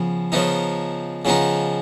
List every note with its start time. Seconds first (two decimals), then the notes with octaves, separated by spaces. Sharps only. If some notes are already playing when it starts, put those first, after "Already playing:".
Already playing: C#3 F3 B3
0.32 C#3 F3 B3 D#4
1.25 C#3 F3 B3 D#4